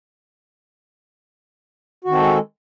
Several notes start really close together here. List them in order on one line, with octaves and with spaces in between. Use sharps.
F#4 D#3 C4 A4 G#3